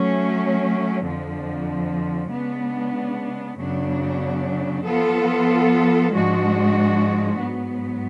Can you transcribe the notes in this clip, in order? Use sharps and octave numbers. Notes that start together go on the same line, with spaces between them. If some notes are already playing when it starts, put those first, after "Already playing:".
Already playing: F#3 A3 C#4
F2 D3 F3
C#3 G#3 B3 D4
F#2 C#3 F#3 B3 D4
F3 B3 F4 A4
G#2 F3 G#3 D4 F#4
G#2 F#3 B3